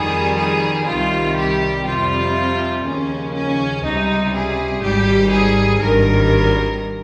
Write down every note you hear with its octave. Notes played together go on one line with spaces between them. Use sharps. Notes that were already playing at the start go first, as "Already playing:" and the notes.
Already playing: F2 D#3 G3 G#4
G#4
C2 C3 D#3 G3 F4
G4
F2 C3 G3 F4
D#2 C#3 F3 C#4
C#4
C#2 C3 G3 D#4
G#4
G#1 G#2 G3 G4
G#4
G#1 G2 D#3 G3 A#4